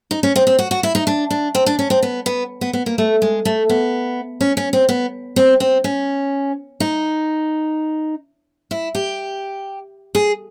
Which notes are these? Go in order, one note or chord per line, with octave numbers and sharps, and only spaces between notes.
D#4
C#4
C4
C4
F#4
F#4
E4
D#4
D4
D4
C4
D4
C#4
C4
B3
B3
B3
B3
A#3
A3
G#3
A3
B3
C#4
C#4
C4
B3
C4
C4
C#4
D#4
E4
G4
G#4